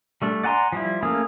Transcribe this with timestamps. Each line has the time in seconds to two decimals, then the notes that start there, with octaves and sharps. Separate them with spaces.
0.22 G3 A3 D4
0.43 D5 F#5 G#5 A#5 C6
0.72 F3 G3 E4
1.03 A3 A#3 C#4 G#4